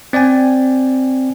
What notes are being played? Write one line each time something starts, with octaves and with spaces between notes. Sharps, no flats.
C4 D5 G5 G#5